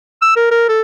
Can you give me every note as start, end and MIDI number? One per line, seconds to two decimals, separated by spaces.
0.22 0.33 88
0.36 0.49 70
0.51 0.68 70
0.69 0.82 69